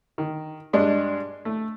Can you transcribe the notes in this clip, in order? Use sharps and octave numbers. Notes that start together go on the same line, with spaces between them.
D#3
G2 G#3 D4
A3